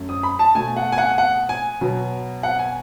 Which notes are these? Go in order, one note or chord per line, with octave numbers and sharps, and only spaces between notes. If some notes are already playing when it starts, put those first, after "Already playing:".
Already playing: F#2 A3
D#6
B5
A5
B2 A3 G#5
F#5
G#5
F#5
F#5
G#5
B2 F#3 B3
F#5
G#5